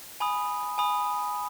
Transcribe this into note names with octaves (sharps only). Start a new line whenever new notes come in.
G#5 B5 D#6
G#5 B5 D#6